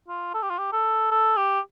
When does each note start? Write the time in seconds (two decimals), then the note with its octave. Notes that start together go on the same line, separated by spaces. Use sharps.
0.08 F4
0.34 A4
0.42 G4
0.50 F4
0.58 G4
0.72 A4
1.11 A4
1.37 G4